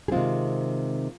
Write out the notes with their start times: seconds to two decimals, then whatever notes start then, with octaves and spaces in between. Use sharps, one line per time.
0.08 G#4
0.12 C3 D#3 G#3 C4 F4